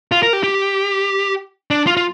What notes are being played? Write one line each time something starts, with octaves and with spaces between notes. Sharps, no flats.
F4
A#4
G4
G4
D4
F4
F4